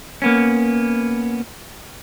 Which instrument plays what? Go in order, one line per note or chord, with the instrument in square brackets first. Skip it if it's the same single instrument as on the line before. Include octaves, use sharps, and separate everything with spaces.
[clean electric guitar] A#3 B3 C#4